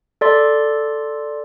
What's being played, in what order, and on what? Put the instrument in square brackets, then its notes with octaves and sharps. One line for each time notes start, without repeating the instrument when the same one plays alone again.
[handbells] A4 D5 C6